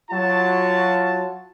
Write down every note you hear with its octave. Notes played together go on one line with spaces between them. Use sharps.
F#3 F4 F#4 A5